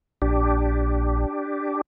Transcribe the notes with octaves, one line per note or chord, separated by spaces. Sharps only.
A#1 D4 G4